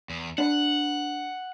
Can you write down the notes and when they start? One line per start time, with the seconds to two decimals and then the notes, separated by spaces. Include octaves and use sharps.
0.10 E2
0.38 D4 B4 F#5